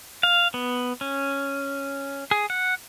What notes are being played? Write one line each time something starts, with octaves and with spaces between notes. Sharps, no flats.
F5
B3
C#4
G#4
F#5